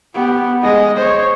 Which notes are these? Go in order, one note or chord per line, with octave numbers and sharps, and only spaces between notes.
B3 G4
G#3 D#5
C5 C#5